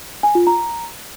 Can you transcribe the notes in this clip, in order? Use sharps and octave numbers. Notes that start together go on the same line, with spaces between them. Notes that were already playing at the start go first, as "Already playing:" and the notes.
G#5
F4
A#5